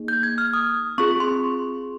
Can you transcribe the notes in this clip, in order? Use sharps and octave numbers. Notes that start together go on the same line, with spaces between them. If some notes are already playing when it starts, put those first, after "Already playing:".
Already playing: A#3 D#4 G#4
G6
G#6
F6
D#6
C4 F4 G#4 C#6
C6